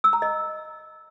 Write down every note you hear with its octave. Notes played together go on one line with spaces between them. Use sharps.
E6
A#5
D#5